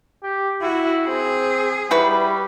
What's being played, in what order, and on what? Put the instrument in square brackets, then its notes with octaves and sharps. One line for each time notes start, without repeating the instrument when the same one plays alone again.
[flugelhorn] G4
[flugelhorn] E4 [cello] F#4
[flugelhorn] C4 [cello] G#4
[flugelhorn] G3 [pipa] E4 F#4 B4